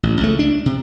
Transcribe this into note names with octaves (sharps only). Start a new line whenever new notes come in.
A1
C#2 A3
D4
C3